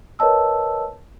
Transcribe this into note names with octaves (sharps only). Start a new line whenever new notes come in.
A#4 B4 C#5 D#5 A5 E6